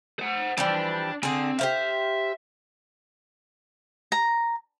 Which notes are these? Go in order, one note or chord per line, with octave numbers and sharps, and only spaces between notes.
C5 F#5
E3 F3 G3 D4 D5
D3 C4 G#4
G4 C5 E5 F5
A#5